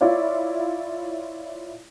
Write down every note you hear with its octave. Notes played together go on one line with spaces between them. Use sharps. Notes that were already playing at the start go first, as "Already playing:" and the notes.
E4 F4 C#5 D5 F5